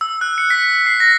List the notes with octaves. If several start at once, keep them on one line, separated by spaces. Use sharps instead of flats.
E6
F#6
C#7
B6
C7
A#6